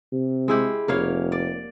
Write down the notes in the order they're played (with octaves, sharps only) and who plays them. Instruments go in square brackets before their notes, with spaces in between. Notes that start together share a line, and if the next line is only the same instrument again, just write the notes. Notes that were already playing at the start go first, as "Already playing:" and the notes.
[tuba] C3
[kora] G#3 E4 G4
[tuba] F1 [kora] A#3 C#5 F5
[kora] D5